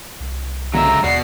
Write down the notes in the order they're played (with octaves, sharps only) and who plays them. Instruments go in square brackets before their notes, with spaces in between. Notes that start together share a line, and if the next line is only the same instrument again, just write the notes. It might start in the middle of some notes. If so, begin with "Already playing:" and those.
[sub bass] C2
[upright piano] C#2 F#2 D3 [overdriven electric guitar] F#3 E5 [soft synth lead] A#5
[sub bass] D#2 [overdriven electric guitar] B2 F#4 [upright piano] D5 [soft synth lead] C7